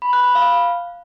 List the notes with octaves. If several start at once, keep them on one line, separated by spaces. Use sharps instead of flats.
B5
F#6
B5
F5